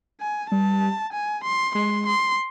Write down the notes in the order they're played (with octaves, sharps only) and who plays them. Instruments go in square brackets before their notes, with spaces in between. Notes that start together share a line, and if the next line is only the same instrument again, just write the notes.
[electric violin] G#5
[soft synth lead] G3 [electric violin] A5
[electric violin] G#5
C6
[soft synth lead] G#3 [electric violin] C6
[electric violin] C6